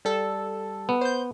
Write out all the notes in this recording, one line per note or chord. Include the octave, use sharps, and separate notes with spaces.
G3 A4
B3
C5 G6